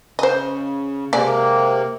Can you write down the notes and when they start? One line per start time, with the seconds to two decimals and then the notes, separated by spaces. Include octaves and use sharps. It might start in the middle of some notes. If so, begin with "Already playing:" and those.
0.19 C#3 C5 D#5
1.13 C3 G#3 A#3 D5